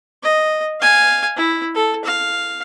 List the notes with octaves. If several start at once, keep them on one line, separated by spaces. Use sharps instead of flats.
D#5
F5 G#5
E4
A4
F5